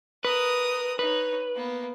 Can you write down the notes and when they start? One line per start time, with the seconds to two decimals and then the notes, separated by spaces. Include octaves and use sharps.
0.25 A#4 B4 D#6
0.99 D#4 B4 C#5
1.56 A#3 B3